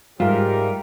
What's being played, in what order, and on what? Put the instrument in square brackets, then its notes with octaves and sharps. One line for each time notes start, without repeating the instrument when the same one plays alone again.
[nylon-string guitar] G#2 [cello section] G3 [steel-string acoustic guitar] F4 E5 [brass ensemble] G4 A#4